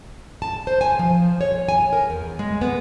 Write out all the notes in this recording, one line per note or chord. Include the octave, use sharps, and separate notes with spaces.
A5
C5
G#5
F3
C#5
G#5
A#4
E2
G#3
B3